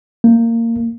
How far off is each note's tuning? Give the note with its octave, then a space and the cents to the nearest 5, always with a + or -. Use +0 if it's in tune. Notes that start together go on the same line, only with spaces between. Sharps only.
A#3 -20